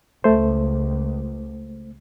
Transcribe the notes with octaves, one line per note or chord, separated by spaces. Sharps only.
C#2 A3 C5